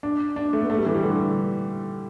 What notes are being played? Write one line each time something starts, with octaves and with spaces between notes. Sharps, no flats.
D4
D4
A3
B3
A3
G3
E3
G3
D3